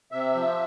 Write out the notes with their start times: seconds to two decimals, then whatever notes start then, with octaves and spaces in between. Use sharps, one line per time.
0.12 C3 E5
0.35 F3